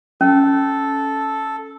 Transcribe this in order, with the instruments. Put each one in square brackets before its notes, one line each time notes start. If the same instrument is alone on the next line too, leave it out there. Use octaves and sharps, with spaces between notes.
[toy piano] C#4 [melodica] A4